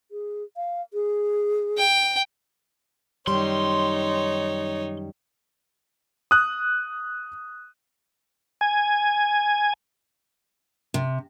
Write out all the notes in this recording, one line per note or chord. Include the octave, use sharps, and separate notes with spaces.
G#4
F5
G#4
G5
F#2 D#3 G3 D#4 C#5 C6
D#6 F#6
G#5
C3